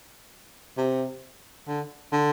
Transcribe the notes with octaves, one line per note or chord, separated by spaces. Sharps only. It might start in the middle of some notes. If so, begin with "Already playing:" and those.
C3
D3
D3